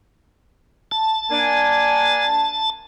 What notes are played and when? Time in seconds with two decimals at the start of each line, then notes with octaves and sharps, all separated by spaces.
0.92 A5
1.31 A#3 D4 G#5